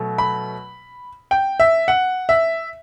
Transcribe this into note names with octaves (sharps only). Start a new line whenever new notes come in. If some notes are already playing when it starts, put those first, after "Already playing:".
Already playing: B2 F#3 A3
B5
G5
E5
F#5
E5